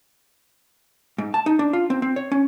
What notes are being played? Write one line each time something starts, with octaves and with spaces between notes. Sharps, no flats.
G#2
A5
D#4
D4
F4
C4
C4
C#5
C#4